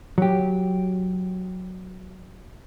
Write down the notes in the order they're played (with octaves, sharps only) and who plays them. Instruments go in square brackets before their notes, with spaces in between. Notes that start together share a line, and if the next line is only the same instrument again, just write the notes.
[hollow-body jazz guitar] F#3 G4